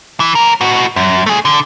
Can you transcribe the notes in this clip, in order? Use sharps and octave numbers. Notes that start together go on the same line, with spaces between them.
E3
C#2 A#4
A2 F#4
F#2
A3 G#4
D3